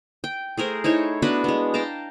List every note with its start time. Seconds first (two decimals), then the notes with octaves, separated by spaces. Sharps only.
0.24 G5
0.57 A3 G#4 A#4 C5
0.84 D#4 E4 C5 C#5
1.22 B3 D4 F#4 B4
1.44 G#3 B3
1.74 F5 G5 A5 A#5